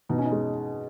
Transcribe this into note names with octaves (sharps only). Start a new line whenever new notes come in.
B2 D#4
C#4
D#4
G#3